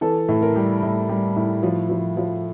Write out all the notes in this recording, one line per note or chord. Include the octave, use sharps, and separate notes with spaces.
E3 A4
A2
A#4
G3
A2
G3
A2
F3
F3
F3